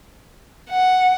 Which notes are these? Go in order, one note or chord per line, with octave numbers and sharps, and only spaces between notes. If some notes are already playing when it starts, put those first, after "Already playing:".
F#5